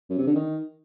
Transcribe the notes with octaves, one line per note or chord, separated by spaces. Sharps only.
F#2
C3
D3
D#3